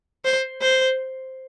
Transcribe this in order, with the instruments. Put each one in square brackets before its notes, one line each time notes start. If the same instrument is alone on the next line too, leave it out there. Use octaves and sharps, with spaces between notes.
[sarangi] C5
C5